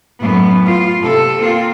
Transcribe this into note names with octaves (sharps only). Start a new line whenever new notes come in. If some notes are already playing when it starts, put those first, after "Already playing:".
F#2 A2 B3
F4
C3 A4
A#3 C4 F4